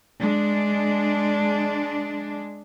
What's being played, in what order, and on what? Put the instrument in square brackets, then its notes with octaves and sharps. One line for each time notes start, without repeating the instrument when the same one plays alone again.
[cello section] G#3 D4